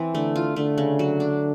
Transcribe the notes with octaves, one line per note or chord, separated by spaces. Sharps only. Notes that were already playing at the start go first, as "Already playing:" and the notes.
Already playing: E3 C4
D3 A3
F4
D3 A3
C#3
F#3
D4